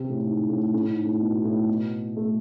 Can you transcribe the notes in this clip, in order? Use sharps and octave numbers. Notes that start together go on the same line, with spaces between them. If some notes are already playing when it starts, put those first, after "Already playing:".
Already playing: C3
A2
G#2
A2
A2
G#2
A2
B2
A2
B2
A3